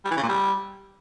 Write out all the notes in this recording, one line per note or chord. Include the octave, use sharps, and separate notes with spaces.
G3
E3
C#3
A#2
G3